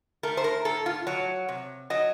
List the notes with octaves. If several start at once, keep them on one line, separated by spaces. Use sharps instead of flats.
A3 A#4
C5
A#4
A2 A4
F4
F#3 C#5
C3
F#3 D#5